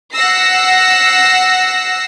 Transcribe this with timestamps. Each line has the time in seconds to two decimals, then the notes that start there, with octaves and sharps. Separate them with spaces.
0.13 F#5 E6 A#6 C7